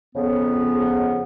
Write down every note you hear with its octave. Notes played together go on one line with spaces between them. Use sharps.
F2 C#3 B3